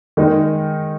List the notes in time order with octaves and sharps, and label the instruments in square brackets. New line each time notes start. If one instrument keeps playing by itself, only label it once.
[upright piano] D#3 G#3 D#4